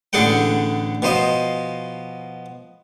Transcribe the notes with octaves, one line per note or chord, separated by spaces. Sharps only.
A1 D3 G#4 A4 F#5 G5
B2 F3 C5 D#5